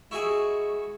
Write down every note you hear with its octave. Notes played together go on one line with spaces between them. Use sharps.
G#3 E4 F#4 G#4 C#6